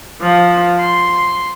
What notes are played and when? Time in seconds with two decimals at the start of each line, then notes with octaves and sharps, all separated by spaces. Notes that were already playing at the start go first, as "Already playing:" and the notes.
0.21 F3
0.80 C6